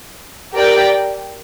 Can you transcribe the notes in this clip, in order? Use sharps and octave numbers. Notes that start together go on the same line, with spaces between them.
G4 A#4 D5 G5